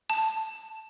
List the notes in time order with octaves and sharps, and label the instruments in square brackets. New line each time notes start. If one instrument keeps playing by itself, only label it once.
[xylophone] A5